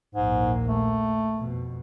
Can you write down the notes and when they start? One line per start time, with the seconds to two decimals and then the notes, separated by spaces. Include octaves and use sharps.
0.15 A#1 D#2 G#2 A#3
0.68 A3
1.37 F2 B2